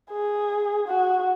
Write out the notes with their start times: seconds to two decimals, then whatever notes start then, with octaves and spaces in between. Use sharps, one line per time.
0.12 G#4
0.88 F#4